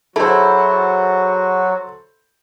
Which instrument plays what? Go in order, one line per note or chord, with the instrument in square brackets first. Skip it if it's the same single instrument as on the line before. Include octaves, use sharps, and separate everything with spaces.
[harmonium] F#3 F#4 [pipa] E4 [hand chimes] G#4 [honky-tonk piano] A4 C5